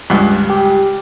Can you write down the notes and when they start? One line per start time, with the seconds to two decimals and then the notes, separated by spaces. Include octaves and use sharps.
0.10 C#2 G2
0.50 G4